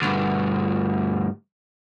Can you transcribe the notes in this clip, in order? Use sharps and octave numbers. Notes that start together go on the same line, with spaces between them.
D2 G2